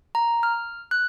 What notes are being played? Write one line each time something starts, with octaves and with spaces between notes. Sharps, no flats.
A#5
F6
F#6